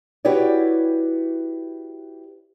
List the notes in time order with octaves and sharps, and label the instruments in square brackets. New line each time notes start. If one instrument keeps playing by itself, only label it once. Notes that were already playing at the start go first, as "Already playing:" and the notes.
[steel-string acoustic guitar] E4 F#4 G4 B4 C#5 D5